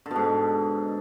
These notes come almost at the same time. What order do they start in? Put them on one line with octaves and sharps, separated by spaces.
D3 B2 G#2